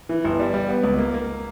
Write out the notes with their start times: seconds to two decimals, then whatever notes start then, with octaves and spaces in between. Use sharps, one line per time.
0.09 E3
0.24 G1
0.39 G3
0.54 G3
0.69 B3
0.83 C#2
0.98 A#3
1.14 A#3